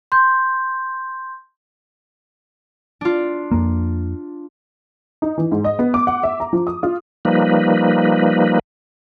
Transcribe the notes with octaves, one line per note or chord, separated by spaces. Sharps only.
C6 G6
D4 F4
F2 A#3
D#4
E3
G#2
D#5
B3
D6
F#5
E5
A#5
F3
D#6
F4
F3 G3 A#3 D#4 B4